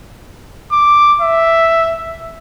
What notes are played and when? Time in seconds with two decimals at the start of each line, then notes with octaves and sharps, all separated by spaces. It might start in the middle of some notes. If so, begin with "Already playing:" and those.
0.72 D6
1.21 E5